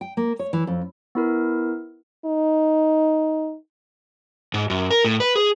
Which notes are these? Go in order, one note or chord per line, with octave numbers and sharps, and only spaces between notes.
G5
A#3
C#5
E3
F2
B3 E4 A#4
D#4
G#2
F#2
A#4
A2
B4
G#4